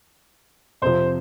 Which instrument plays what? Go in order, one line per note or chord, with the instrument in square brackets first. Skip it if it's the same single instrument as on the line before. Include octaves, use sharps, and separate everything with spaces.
[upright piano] F2 C3 F3 [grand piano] C5